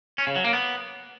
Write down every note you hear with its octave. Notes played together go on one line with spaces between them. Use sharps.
C#4
C#3
F#3
A#3
B3